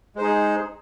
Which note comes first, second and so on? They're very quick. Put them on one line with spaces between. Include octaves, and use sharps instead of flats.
G#3 C5 D#4 G#4